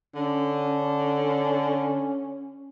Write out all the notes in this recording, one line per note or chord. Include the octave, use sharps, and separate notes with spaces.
D3 C#4